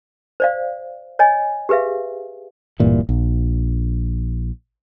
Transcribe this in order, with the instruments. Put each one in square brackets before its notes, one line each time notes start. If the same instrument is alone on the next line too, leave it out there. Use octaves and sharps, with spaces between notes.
[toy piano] C5 D5 F5
C#5 D#5 G#5
G4 G#4 B4 E5 F5
[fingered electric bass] D1 G2 A#2 E3
A#1